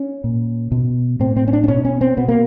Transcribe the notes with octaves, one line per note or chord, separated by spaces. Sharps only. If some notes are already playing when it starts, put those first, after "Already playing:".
Already playing: C#4
A#2
B2
A2 C4
C4
C#4
D4
D4
B2 C#4
C#4
C4
B2 B3
A#3